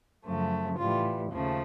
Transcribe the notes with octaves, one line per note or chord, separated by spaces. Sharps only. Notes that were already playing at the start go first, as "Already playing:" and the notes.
F#2 C#3 F3 A3
A2 E3 G3 F4
D#2 C#3 F3 A3